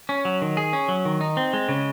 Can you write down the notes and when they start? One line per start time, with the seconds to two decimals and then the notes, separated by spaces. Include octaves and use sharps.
0.09 C#4
0.25 F#3
0.42 D#3
0.57 G#4
0.73 C#4
0.88 F#3
1.05 D#3
1.21 D#4
1.37 C4
1.53 G#3
1.69 C#3